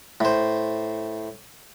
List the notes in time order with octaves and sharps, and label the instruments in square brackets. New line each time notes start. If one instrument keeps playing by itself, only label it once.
[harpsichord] A2 C5